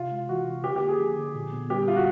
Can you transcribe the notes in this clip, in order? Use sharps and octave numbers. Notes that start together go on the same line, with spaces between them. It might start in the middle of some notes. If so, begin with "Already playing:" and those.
Already playing: C3 F4
G#3
E3 F#4
C3
D3 G4
G4
A#3
G#4
F3
D3
A#2
B3
G3 G4
A#2 F4
F#4